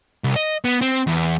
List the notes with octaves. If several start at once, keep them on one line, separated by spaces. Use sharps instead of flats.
C2
D#5
B3
C4
E2